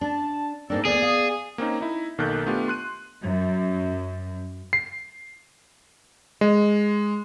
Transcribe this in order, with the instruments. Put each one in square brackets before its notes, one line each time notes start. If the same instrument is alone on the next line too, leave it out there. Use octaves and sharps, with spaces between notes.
[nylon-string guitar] D4 [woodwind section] A5
[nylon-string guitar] G#2 A#3 D4 [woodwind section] C4 D#4 A4
[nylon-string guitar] D2 A#3 [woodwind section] B3 D5 D#6 [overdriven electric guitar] G#4
[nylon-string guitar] F5
[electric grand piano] A#3 C4 C#4 D#4
D#4 E4
B1 D#3 A#3 A4 F#6 G6
A3 B3 D4 F4 G4
C6 F#6 D#7
[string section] F#2
[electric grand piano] C7
G#3